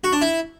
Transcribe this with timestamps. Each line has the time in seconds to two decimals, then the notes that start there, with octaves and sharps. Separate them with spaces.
0.04 F#4
0.13 D4
0.21 E4